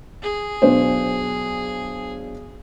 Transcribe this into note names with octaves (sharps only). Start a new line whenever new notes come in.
G#4
B1 D4 C5